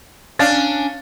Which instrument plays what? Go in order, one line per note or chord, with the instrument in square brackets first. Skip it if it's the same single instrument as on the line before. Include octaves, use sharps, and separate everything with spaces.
[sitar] C#4 D4 [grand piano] F5 A6